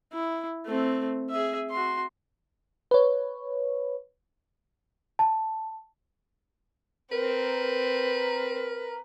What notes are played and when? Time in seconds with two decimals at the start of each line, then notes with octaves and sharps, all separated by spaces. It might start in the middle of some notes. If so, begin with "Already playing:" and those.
0.12 E4
0.66 A3 C4
1.30 G#4 E5
1.71 F#4 C6
2.91 B4 C#5
5.19 A5
7.12 C4 A#4 B4